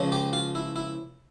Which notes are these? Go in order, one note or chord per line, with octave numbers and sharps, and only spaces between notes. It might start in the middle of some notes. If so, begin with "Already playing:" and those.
Already playing: C#2 C#3 F3
G4
F4
E4
E4